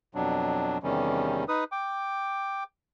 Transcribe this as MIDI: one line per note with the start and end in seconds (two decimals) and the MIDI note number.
0.15 0.78 41
0.15 0.78 47
0.15 0.78 54
0.15 0.78 62
0.83 1.44 40
0.83 1.44 48
0.83 1.44 51
0.83 1.44 55
0.83 1.44 61
1.48 1.64 63
1.48 1.64 71
1.48 1.64 87
1.72 2.64 79
1.72 2.64 86